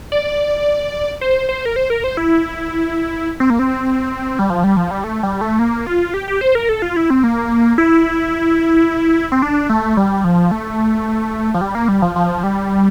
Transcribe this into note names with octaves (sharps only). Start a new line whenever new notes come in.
D5
C5
C5
A#4
C5
A#4
C5
E4
C4
A#3
C4
G3
F3
G3
F3
G3
A3
G3
A3
A#3
F4
G4
G4
C5
A#4
A4
F4
E4
C4
A#3
E4
C4
D4
A3
G3
F3
A3
F3
G3
A#3
G3
F3
F3
G3